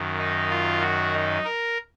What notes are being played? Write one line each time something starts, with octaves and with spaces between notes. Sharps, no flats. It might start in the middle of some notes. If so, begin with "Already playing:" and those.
Already playing: F#2 D#3
D#4
F4
F#4
D#4
A#4